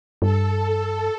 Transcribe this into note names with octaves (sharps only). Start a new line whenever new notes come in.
G2 A4